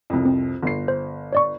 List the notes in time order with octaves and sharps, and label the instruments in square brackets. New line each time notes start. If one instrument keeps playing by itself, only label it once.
[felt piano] C2 F2
[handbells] C4
[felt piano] G1 C7
[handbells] C5
C#5 D5 C#6